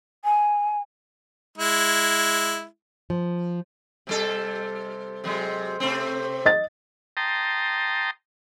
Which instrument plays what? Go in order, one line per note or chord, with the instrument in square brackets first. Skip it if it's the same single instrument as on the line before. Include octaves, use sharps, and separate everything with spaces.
[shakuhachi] G#5
[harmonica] G#3 E4
[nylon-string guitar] F3
[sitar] C3 G3 A4
C3 F#3 G#3
C3 A3 C4
[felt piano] D#5 A6
[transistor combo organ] G5 A5 A#5 C6 D#6